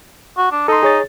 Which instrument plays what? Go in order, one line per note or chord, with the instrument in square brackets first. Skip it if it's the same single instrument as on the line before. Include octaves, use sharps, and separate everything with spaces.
[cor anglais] F#4
D4
[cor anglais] D#4 [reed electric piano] A4 C6
[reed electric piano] G#4 C#5 A6